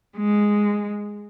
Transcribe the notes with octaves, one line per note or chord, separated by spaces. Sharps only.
G#3